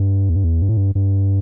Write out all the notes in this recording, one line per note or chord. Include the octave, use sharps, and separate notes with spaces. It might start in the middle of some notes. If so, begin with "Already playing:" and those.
Already playing: G2
E2
G2
E2
G2
A2
G2
G2